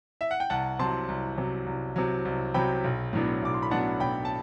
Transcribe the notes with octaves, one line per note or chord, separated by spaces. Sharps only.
E5
F#5
G5
C2 F#5 A5
C3 F#3 A5 C6
C2
C3 F#3
C2
C3 F#3
C2
C3 F#3 G5 B5
B1
A2 F#3 B3 D4
B1 D6
C6
B5
A2 F#3 B3 D4 F#5 A5
B1 G5 B5
A5